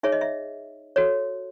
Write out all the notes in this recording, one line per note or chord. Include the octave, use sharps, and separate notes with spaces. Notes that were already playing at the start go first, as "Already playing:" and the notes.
D#4 G#4 C#5 E5
D#5
E5
F#4 A4 C#5